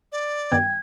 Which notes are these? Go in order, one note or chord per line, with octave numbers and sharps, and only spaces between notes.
D5
G2 D#3 B3 G5 G#6